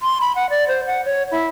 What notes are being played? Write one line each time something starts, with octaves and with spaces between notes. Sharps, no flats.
C6
B5
F#5
D5
C5
F#5
C#5
E4